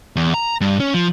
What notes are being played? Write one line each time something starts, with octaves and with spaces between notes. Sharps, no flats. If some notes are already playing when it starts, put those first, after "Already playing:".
E2
A#5
G2
C#4
F3